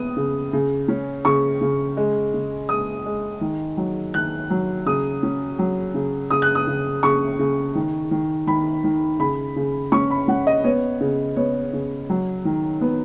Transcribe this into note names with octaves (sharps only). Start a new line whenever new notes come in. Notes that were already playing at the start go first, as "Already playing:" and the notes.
Already playing: B3 D#6
C#3
C#3
C#4
C#3 C#6
C#3
G#3
C#3
G#3 D#6
G#3
D#3
F#3
D#3 F#6
F#3
C#3 D#6
C#4
F#3
C#3
C#3 D#6
F#6
D#6
C#3
C#3 C#6
C#3
D#3
D#3
D#3 B5
D#3
C#3 B5
C#3
C#4 C#6
B5
C#4 F#5
D#5
B3 C#5
C#3
B3 C#5
C#3
F#3
D#3
B3